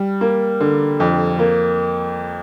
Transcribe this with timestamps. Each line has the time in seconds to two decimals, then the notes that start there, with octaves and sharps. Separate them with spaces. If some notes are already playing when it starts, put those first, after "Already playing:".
Already playing: G3
0.21 A#3
0.60 D3
1.00 F2
1.39 A#3